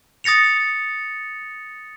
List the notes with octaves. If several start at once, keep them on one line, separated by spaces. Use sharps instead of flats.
D#6 A6 A#6 C#7 F7